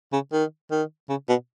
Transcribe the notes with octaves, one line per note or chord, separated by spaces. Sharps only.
C#3
D#3
D#3
C#3
B2